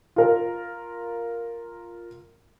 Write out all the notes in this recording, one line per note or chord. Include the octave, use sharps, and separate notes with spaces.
F4 A#4